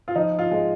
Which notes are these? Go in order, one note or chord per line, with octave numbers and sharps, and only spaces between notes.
F4
F3 D#4
F4
G#3